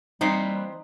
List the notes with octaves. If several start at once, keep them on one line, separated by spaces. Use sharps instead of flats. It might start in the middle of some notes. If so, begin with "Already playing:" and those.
E3 G3 A#3 C4 D#4 B4 C5 F5